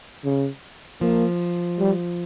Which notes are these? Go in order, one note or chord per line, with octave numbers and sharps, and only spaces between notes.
C#3
F3 A#3
G3